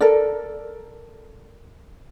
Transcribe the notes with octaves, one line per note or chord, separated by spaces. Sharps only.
A4 A#4 D5